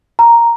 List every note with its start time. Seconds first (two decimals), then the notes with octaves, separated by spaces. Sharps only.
0.19 A#5